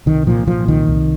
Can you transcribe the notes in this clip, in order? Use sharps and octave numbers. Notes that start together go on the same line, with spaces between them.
C2 D#3
A#2 F3
A#2 F3
C2 D#3
C2